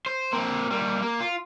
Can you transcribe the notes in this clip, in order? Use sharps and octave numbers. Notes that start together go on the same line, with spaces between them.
C5
A#3 C4
G3 A#3
A#3
F4